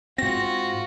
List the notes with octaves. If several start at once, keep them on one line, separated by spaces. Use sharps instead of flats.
G#2 C4 F4 F#4 A#6